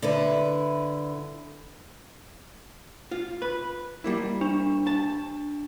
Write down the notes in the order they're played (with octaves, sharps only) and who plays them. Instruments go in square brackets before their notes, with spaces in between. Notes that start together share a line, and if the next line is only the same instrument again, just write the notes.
[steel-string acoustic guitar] D3 E4 B4
[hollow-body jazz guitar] F4
B4
G3 A#3 E4
[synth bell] D4
[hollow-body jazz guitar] A5